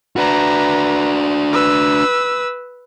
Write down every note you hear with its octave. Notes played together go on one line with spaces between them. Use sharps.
D4 F#4 B4 A#5
B4 E6